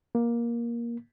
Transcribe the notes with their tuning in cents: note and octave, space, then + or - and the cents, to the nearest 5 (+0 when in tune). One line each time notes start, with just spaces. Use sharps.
A#3 +15